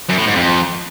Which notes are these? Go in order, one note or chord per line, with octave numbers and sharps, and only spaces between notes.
F#2
A2
G#2
F2